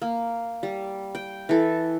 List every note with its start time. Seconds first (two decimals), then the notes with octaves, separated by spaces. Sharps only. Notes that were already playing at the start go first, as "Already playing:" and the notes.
0.02 A#3
0.63 G3
1.15 G5
1.49 E3 A4